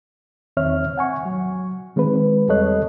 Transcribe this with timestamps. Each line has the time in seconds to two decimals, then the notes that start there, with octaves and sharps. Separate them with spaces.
0.57 E2 D#3 C4 C#5 E5 F6
0.98 F#5 G#5 C#6
1.26 F#3
1.96 D#3 G#3 C4 B4
2.49 E2 G3 A4 C#5 D#5 F#6